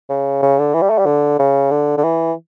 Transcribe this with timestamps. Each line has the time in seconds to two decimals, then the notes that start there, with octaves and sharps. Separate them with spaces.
0.09 C#3
0.42 C#3
0.59 D3
0.74 E3
0.82 G3
0.90 A3
0.98 G3
1.06 D3
1.39 C#3
1.71 D3
1.97 D3
2.03 E3